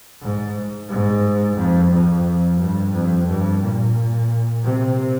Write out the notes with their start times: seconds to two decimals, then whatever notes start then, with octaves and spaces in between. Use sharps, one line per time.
0.20 G#2
0.89 G#2
1.56 F2
1.90 F2
2.59 G2
2.93 F2
3.26 G2
3.61 A#2
4.63 C3